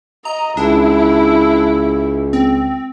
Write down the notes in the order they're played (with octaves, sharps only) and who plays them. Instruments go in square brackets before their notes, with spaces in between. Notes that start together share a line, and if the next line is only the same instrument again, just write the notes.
[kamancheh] D#5 [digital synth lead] A#5
[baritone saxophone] C#2 [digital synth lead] D4 [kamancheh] E4
[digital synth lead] C4